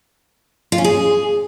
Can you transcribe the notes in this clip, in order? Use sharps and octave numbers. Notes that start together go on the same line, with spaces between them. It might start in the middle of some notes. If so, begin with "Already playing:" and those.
F4
C#4
G#4